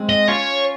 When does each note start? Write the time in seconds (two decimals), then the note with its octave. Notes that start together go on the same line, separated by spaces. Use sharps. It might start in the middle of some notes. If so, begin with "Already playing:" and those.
Already playing: G#3 C4
0.09 D#5
0.28 C#4 F4 C#5